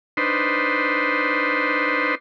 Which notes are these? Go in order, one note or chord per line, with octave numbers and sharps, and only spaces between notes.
D4 D#4 B4 C5 C6